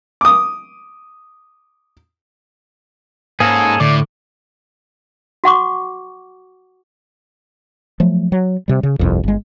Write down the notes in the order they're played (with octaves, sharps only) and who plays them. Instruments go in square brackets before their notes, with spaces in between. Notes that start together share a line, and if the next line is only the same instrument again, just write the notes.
[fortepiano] D6 D#6
[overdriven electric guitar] G#2 [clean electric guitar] A#3 C#4 [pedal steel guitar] G#4 A4
[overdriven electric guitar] A2 [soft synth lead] D3 [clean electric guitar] D5
[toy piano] F#4 F#5 C#6 D6
[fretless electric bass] F3 F#3 A3
F#3
C3 G3
C#3
G1 C2 F2
G1 G#3